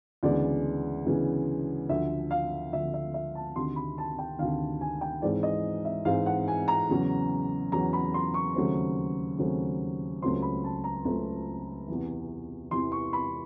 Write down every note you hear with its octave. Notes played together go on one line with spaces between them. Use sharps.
D2 C#3 E3 G#3 B3 D5
D2 C#3 E3 G#3 B3
D2 D3 F3 E5
F5
D2 D3 F3 E5
E5
E5
A5
D2 C3 D#3 C6
B5
A5
G5
D2 C3 D#3 F5
G#5
G5
G#2 E3 G#3 C4 D5
D#5
E5
G#2 E3 G#3 C4 F5
F#5
G#5
A#5
E2 C#3 F#3
E2 C#3 F#3 A#5
B5
C6
C#6
D#2 C#3 F#3 A3 C4
D#2 C#3 F#3 A3 C4
C#2 C#3 F#3 A3 C4 C6
B5
A5
A#5
C#2 C#3 F#3 A3 C4 A#5
E2 C3 E3
E2 C3 E3 C6
C#6
B5